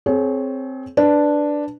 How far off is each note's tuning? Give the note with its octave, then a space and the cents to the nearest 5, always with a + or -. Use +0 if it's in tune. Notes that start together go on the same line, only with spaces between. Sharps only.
C4 +0 G#4 +35 C#5 +0
D4 +0 B4 +0